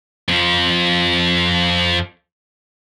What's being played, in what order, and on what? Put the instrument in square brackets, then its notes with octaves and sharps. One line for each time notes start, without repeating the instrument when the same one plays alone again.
[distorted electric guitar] F2 F3